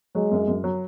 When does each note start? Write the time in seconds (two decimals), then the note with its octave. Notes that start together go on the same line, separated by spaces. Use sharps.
0.15 F#3 G#3
0.31 F#2
0.48 F#2
0.64 F#3